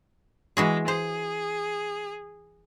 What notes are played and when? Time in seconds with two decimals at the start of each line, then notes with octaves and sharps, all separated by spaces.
0.57 E3 G#3 F#4 G#4
0.88 G#4 C5